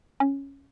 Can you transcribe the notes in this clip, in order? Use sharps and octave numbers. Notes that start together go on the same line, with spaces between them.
C#4